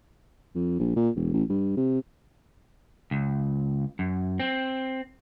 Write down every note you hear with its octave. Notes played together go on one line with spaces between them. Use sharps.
F2
A#1
A#2
E1
A1
G2
C3
C#2
F#2
C4